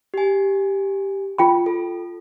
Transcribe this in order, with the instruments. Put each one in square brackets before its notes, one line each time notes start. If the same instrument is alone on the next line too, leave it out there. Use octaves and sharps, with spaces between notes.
[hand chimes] G4 G#5
[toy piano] F4 G5 B5
[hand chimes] A4